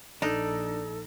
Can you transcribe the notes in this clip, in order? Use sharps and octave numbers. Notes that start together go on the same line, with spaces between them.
A#1 D4 D#4 A4